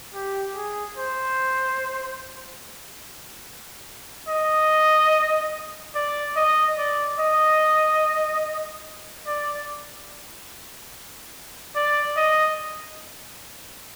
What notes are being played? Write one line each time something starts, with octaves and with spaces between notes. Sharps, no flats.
G4
G#4
C5
D#5
D5
D#5
D5
D#5
D5
D5
D#5